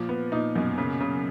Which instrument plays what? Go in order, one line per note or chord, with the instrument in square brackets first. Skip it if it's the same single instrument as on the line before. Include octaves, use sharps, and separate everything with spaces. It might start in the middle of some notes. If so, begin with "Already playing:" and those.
Already playing: [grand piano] A#2 [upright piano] F3
[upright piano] B3
[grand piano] A#2 [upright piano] D#4
[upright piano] F#2 [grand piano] B2
[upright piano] C#3
C#3